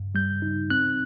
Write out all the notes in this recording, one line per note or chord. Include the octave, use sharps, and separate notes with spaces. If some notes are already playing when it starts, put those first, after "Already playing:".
Already playing: G2
G3 G6
D#4
C4 F#6